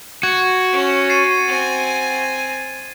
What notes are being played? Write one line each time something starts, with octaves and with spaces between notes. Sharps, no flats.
F#4 G#6
C#4
A6 C7 D#7
C4 G#5